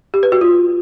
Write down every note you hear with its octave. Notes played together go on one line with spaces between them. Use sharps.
G4
B4
F#4
F4